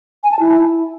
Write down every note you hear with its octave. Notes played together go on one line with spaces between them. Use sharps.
G#5
A5
E4